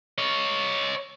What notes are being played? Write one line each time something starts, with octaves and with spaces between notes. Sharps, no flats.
C#5 D#5